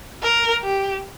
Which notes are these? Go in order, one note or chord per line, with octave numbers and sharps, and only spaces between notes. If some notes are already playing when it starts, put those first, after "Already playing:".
A#4
G4